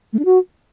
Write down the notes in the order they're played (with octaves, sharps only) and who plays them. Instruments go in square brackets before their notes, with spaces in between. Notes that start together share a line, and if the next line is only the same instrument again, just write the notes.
[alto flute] A3
D4
F#4